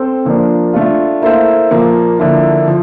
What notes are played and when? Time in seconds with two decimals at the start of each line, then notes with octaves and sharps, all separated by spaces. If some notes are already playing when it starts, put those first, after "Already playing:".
Already playing: C4 A4 C5
0.25 A#2 F3 A#3 D4
0.73 A3 D4 F4
1.22 A#3 E4 A4 C5 F5
1.71 A#2 F3 A#3
2.20 D3 F3 A#3 E4
2.68 F3